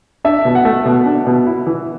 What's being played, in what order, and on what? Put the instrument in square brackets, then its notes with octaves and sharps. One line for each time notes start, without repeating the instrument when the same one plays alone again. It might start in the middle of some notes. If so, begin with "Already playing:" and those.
[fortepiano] D4 [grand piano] E5
[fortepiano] B2
[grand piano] F#5
[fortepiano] A3
B2
D4
B2
E4
E3